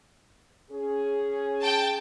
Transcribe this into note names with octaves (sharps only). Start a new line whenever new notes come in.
C#4 G#4
G5 A5